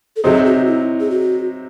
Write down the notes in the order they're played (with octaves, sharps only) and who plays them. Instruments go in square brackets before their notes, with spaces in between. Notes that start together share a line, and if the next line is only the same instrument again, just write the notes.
[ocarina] A4
[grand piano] C3 F#3 C4 D#4 [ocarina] G#4
[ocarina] F#4
E4
G#4
F#4